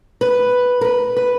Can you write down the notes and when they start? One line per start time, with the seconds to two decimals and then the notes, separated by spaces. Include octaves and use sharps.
0.21 B4
0.81 A#4
0.85 B4
1.17 B4